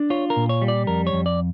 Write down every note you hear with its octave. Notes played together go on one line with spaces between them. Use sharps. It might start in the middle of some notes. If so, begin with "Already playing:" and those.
Already playing: D4
F4 C#5
A#4
A#2
C#5
G3
D5
F2 A#4
C#5
F2
D5